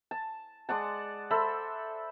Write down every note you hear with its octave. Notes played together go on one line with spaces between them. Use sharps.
A5
G#3 D5 F#5 A5
A4 C5 E5 B5